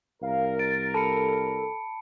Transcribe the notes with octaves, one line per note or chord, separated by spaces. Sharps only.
C2 A#4 F5
A6 D7
A4 A5 B5 C#7